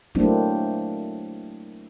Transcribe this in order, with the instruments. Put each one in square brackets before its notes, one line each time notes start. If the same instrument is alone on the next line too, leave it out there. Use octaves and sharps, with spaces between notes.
[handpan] F#3 A3 A#3 C4 D4 E4